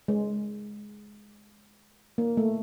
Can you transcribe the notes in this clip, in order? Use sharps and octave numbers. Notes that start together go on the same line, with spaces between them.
G#3
A#3
A3